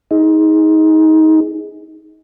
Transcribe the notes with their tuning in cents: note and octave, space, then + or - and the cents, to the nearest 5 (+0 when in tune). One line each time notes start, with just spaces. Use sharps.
D#4 +25 G#4 +0